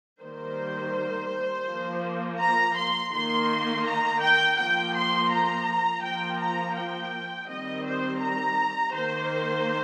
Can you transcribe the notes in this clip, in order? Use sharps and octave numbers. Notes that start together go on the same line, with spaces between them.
D#3 G3 A#3 C5
F3 A#3
A#5
C6
D#3 A#3 C6
A#5
G5
F3 A#3 G5
C6
A#5
F3 A#3 G5
A#5
G5
D#3 G3 C4 D#5
C5
A#5
D#3 A#3 C5